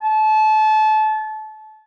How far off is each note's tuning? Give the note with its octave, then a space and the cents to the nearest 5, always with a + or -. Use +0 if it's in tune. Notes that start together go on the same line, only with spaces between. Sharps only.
A5 -30